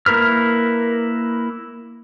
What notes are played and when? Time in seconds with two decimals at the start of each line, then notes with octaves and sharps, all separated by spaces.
0.06 A#3 E4 A#4 B4 F6